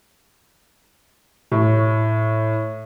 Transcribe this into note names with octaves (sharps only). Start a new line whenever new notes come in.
A2